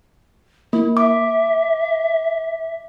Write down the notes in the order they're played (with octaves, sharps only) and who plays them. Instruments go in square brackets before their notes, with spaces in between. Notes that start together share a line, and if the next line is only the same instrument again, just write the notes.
[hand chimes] A#3 [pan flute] E4
[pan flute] E5 [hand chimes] D6